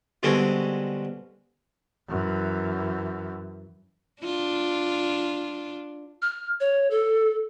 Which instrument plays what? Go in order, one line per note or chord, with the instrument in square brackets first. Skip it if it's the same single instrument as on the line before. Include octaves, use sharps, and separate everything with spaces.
[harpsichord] B2 D3 G3 G#3 C4 C#4
[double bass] F#2 E3
[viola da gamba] D4 F4
[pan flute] F6
C#5
A4